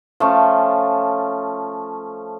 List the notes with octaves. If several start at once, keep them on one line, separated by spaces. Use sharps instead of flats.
F3 A3 C#4